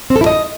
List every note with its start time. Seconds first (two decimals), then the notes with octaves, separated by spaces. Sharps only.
0.10 C4
0.16 A4
0.21 E4
0.26 D#5